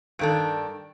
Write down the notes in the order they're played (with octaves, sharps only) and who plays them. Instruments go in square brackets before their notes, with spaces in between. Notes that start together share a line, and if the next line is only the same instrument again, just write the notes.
[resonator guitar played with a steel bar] G2 D#3 D4 [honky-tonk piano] A4 D7